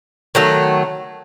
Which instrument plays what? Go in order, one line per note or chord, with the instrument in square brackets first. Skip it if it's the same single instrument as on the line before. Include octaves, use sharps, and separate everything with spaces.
[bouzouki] D#3 F#3 A3